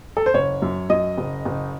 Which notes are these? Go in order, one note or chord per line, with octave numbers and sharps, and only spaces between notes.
A4
C5
F#1 C#5
F#2
F#2 D#5
F#1
F#1